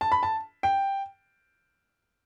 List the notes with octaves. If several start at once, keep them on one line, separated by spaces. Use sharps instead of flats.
A5
B5
A5
G5